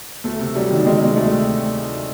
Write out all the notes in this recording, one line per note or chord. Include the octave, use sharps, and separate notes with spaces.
D2 A3
C3
F#3 G3
D#3
D#3 G#3
C3 G#3
D2 A3